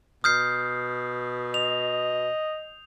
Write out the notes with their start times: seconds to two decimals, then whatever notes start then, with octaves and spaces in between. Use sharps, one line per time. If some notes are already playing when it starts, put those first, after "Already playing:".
0.24 B2 D#6 F6 G6 C7
1.54 D#5 F7